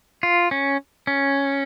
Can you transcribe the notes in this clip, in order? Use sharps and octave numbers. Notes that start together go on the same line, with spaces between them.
F4
C#4
C#4